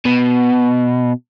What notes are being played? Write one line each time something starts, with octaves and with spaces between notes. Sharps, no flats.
B2